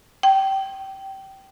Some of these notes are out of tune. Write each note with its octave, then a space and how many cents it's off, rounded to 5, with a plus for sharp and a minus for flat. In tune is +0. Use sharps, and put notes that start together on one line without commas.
G5 -20